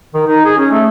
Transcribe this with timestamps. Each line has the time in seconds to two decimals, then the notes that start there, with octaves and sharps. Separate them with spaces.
0.14 D#3
0.26 D#4
0.45 G#4
0.58 C#4
0.71 A3